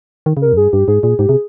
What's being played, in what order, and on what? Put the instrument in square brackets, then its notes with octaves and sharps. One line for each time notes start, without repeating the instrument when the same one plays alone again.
[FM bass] D#3
C#3
[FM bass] C3 [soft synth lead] A#4
[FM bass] F2
[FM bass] G2 [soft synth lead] G#4
[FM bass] G2 [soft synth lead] G4
[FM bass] G#2 [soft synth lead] G#4
[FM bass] A#2 [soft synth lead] G#4
[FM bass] G#2 [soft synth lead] G4
[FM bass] C3 [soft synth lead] G#4